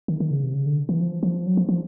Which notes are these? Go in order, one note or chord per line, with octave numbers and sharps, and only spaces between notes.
D#3
D#3
C#3
C3
C#3
D3
E3
F3
F3
F#3
F3
F3